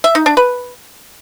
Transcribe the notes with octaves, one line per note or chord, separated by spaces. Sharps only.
E5
D#4
D4
B4